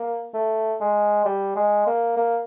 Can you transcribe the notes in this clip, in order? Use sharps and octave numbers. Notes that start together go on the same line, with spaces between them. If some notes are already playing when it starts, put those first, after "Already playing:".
Already playing: A#3
A3
G#3
G3
G#3
A#3
A#3